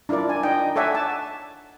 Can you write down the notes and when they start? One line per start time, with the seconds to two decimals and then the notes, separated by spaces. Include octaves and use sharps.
0.09 D4 E4 F4 A#4 D5
0.29 G#5
0.43 D4 D#4 D#5 G5
0.76 A4 C#5 D5 E5 F#5 G#5
0.95 F#5 A5